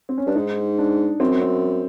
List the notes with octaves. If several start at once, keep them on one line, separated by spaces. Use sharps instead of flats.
C4
C#4
G2 D4
G#2 D#4
D4
F#2 C4
C4